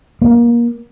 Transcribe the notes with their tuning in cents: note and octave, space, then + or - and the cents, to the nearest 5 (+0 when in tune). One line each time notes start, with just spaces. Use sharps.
A#3 +25